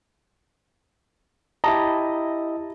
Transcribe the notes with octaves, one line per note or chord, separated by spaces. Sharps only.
E4 G4 D#5 A5 A#5